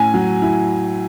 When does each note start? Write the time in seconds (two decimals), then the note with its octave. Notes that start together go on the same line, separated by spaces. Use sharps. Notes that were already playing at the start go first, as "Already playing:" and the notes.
Already playing: A2 C#4 G#5
0.14 F#3
0.42 E4